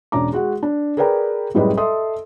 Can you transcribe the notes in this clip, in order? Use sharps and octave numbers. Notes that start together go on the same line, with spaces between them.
E1 C#4 D4 A#5 D6
G#3 F#4 F#5
D4
G#4 A#4 B4 D5 G5 A#5
F#2 A2 G3 G#3 B4 D#5
A4 D#5 E5 C6 D#6